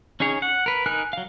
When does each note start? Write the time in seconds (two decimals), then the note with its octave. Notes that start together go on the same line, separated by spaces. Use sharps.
0.20 C#4 D#4 G#4 C#5
0.42 F#5
0.66 A#4 B4
0.86 D#4 A#4 G#5 F6 F#6
1.13 F#3 F5